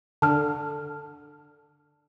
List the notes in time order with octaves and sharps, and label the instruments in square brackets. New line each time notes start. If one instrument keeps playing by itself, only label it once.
[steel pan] D3 [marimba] A5 F6